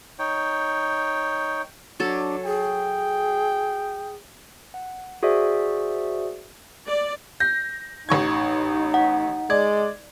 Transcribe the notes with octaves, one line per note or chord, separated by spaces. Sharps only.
D#4 C#5 G5
F#3 D4 A4
G#4 G5
F#5
F#4 G#4 C5 D5 E5
D5
G6 A#6
A1 D#4 C#6 G#6
F#5
G#3 D5 G#6